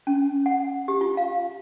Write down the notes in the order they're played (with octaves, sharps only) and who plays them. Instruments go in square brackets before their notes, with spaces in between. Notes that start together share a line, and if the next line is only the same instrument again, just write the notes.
[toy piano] C#4
F#5
G4
F4
F5